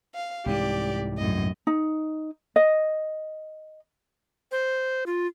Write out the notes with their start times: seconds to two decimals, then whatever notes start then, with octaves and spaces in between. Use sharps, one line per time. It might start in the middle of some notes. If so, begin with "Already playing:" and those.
0.14 F5
0.46 C2 G#2 E3 G4 D5
1.17 F#2 A2 D#5
1.67 D#4
2.56 D#5
4.52 C5
5.06 F4